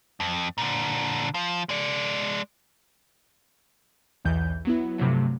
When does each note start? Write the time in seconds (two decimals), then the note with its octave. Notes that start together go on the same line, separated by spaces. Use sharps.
0.20 F2
0.58 A#2 D3
1.34 F3
1.69 G#3 D5
4.25 B1 E2 E3 G6
4.65 F#3 B3 E4
4.98 G2 C3 F3 F#3 A3